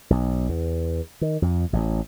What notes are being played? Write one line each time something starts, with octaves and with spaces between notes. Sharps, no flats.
B1
E2
D#3
F2
A1